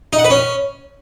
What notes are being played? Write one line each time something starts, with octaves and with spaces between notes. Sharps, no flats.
D#4
F#5
B4
C#4